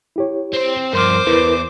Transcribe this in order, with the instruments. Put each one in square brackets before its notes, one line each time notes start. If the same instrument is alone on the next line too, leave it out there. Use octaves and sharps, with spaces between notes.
[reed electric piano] E4 G4 C#5
[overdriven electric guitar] C4 C5
[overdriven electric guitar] G2 F3 [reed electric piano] A#4 C6 F6 [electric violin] C5 D6
[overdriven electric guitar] E2 [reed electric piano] E4 A#4 B4